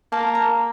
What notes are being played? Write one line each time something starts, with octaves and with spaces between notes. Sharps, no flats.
A#3 A5
A#5